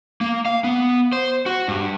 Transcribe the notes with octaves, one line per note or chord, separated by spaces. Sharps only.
A#3
F5
B3
C5
F#4
G2